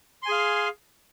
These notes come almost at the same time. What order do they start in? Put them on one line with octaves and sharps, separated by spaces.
C6 G#5 G#4 F5